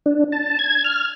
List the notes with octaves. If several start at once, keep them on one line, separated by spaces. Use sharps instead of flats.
D4
A5
G#6
F6